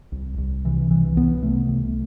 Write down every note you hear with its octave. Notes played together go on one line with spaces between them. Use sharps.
C2
C2
C3 E3
C2 E3
C2 B3
C3 A3
C2